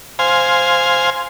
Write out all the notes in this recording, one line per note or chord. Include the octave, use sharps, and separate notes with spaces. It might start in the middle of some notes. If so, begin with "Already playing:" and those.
C5 F5 G#5